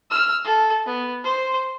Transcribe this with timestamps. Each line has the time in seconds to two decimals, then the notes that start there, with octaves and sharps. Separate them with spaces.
0.11 E6 F6
0.45 A4
0.86 B3
1.24 C5